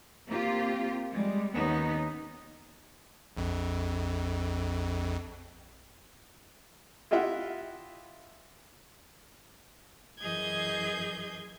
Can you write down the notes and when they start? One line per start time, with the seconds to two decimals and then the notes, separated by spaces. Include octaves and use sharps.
0.28 A#3 C4 F4 G4
1.12 G3 G#3
1.54 D#2 B3 C#4 D#4
3.37 A#1 F2
7.11 E4 F4 G4 D#5 E5 F#5
10.20 F#2 E3 G#4 D#5 G6 G#6